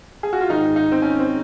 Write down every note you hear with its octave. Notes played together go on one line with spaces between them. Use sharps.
G#4
F#4
F4
G#2 D#3 D#4
D#4
C4
C#4
C4